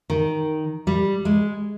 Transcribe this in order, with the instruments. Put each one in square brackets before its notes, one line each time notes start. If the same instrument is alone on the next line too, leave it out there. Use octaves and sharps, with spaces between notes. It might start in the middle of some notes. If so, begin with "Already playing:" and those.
[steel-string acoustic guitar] D#3
G3
G#3